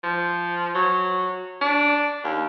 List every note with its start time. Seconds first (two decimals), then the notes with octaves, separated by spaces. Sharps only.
0.03 F3
0.75 F#3
1.61 D4
2.24 D#2